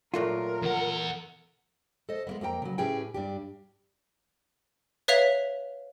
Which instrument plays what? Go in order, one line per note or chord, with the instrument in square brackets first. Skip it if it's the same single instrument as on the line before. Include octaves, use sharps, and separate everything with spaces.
[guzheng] A#2 F#3 A3 [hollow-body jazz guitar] F4 [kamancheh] A#4
[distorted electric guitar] E2 F#5
[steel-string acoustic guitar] A4 C5 D#5
G#3 A#3 B3
F2 A#3 G4 G5 A#5
C#3 F#3
A2 C#4 G4 G#4 B4 G5
G2 D4 G4
[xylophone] B4 C#5 E5 F5 B6 F7